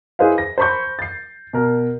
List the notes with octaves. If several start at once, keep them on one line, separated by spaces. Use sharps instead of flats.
E4 G#4 B4 C5 D#5 F5
A#6
C5 A5 B5 C#6 G6
A6 C7
B2 A#4